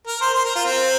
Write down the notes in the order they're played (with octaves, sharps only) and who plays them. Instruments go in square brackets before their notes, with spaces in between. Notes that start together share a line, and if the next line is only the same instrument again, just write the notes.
[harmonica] A#4
C5
C5
A#4
F4
C4